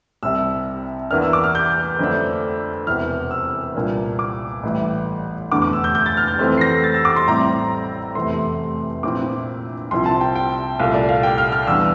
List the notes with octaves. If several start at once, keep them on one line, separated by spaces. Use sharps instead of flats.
C2 C3 G3 E6
E2 E3 A#3 D4 F6
E6
D6
F6
G6
F2 D3 A3 D4
E1 E2 C3 E3 F6
E6
C2 A#2 G3 A#3 D4
D6
A1 A2 E3 G3
F1 E2 D3 D6
D6
E6
G6
G6
A6
F6
G6
F2 E3 A3 C4
C7
A#6
A6
E6
D6
C6
A1 A2 G3 C4 E4 A#5
F1 E2 C3 E3 A3 C6
A#1 A#2 F3 C4 E4 D6
C2 C3 F3 C4 E4 C6
A5
G5
G5
C2 A#2 A3 F5
D5
F5
G5
F6
F6
E2 E3 G3 D4 E6